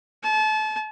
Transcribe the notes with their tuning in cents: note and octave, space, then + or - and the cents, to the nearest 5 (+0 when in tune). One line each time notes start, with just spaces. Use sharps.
A5 -30